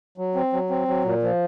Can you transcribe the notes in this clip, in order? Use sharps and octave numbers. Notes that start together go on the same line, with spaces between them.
F#3
C4
F#3
C4
F#3
A#2
F3